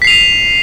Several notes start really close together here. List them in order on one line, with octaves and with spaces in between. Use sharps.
B6 C7 F7 D#7